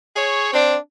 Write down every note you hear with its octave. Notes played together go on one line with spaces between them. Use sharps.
G#4 C#5
C4 D4